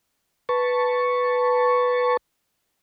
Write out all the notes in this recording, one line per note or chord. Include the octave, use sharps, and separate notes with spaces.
B4 A5 C#6